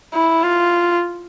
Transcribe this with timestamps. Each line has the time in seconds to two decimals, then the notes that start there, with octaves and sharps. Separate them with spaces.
0.14 E4
0.43 F4